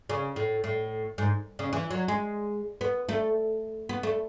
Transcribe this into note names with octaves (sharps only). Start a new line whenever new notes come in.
C#3
A2
A2
G#2
C#3
E3
F#3
G#3
B3
A3
B3
A3